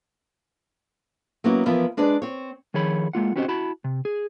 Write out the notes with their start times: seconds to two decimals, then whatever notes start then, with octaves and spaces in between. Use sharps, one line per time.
1.44 F#3 A#3 B3 C#4 E4
1.66 E3 F3 B3 E4 A#4
1.97 G#3 D4 G#4 B4 D5
2.22 C4 C#5
2.74 D#3 F3 G#4 C#5 B5
3.13 G#3 A#3 F4 F#5
3.36 C4 C#4 F#4 G4 C5 D#5
3.48 E4 F#4 A5 B5
3.84 C3
4.05 G#4